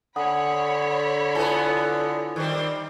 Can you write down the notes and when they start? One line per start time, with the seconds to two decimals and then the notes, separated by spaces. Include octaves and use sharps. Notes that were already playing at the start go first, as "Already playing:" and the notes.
0.16 D3 C#5 F#5 G#5 B5 D#6
1.35 B3 E4 F4 A4 G#5
2.36 D#3 G3 C4